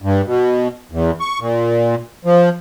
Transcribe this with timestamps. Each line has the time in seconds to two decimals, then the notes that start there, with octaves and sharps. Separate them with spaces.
0.02 G2
0.26 B2
0.92 E2
1.20 C#6
1.40 A#2
2.25 F3